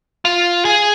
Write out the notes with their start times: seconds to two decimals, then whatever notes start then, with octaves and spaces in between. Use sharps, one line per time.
0.25 F4
0.65 G#4